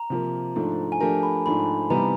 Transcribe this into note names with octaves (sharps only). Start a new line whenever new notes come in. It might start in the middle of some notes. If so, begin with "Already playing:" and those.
Already playing: A#5
C3 F3 A#3
G#2 F3 A3 D4
G#5
F3 A3 D4 G4 A#4 A5
B5
G#2 F3 A3 D4 B5
C3 E3 G3 B3 D#4 A#5